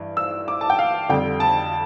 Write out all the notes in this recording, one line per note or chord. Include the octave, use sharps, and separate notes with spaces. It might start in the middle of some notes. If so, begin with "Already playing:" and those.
Already playing: G2 E3
E6
D6
A5
G5
F5
F2 D3 G3 G5
A5